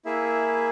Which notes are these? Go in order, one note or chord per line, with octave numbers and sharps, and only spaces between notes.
A#3 E4 G#4 E5